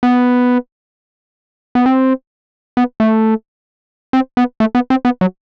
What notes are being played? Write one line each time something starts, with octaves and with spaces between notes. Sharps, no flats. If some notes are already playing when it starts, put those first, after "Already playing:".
B3
B3
C4
B3
A3
C4
B3
A3
B3
C4
B3
F#3